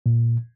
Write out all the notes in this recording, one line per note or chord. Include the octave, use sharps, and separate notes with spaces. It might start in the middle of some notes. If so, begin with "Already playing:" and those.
A#2